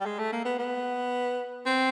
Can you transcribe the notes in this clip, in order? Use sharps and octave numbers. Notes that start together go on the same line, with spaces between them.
G3
G#3
A3
A#3
B3
B3
C4